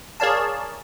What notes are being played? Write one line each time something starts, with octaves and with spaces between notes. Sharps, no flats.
G#4 A#4 C#5 D5 F5 A5